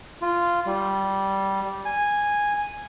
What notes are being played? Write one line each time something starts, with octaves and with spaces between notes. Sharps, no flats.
F4
G3
G#5